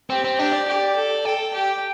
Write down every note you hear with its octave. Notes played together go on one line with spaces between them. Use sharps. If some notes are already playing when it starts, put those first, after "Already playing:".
C4 G4
C4
D4 G4
D5
G4
A4
A4 G5
G4